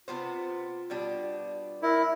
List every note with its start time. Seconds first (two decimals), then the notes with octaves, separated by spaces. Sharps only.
0.08 C3 B3 F4 C5
0.90 B2 G3 D4
1.83 E4 A#4